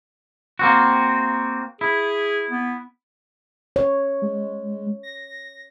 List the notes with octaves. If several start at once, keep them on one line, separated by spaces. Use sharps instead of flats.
A#3 C4 F#4
E4 G#4
B3
C#5
G#3
A#6